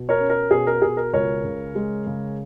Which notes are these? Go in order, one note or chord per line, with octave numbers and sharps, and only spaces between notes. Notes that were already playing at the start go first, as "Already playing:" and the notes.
Already playing: B2
A#4 C#5
C#4
A#4
B2 G#4
A#4
B2 G#4
A#4
C#2 A#4 C#5
C#3
G#3
C#3